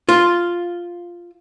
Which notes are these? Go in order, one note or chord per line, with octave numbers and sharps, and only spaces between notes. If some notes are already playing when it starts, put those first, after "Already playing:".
F4